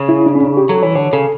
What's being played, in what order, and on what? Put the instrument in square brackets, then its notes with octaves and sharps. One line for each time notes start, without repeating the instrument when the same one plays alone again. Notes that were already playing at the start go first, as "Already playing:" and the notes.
Already playing: [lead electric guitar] C#3
[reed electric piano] E4
D4
C#4
D4
G4
[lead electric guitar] F#3 [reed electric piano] A4
[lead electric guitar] E3 [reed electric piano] C#5
[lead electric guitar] D3 [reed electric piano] C#5
[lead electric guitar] C#3 [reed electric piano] A4